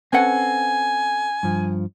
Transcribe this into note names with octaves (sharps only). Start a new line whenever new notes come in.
C4 C#4 A4 B4 F#5 G#5
G2 F3